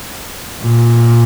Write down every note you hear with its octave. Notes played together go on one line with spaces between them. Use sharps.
A#2